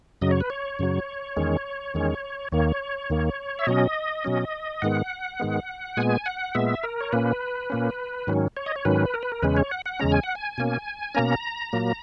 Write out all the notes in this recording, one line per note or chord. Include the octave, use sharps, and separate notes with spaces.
F#2 C#3 F#3 D#5
C#5
B4
C#5
F#2 C#3 F#3
E2 D#3 G#3 C#4
E2 D#3 G#3 C#4
D#2 D#3 A#3 C#5
D#2 D#3 A#3
E5
B2 F#3 C#4 D#5
B2 F#3 C#4
G#2 D#3 G#3 B3 F#5
G#2 D#3 G#3 B3
A#2 G#3 B3 G#5
F#5
A#2 G#3 B3 E5
A#4
C#5
A#2 A#3 C#4 B4
A#2 A#3 C#4
G#2 D#3 F#3 C#4
C#5
D#5
C#5
G#2 D#3 F#3 C#4 B4
A#4
B4
A#4
E2 C#3 G#3 C#4 B4
C#5
F#5
F#5
E2 C#3 G#3 C#4 A#5
G#5
F#5
G#5
B2 A#3 C#4
B2 A#3 C#4 A#5
A#2 F#3 A#3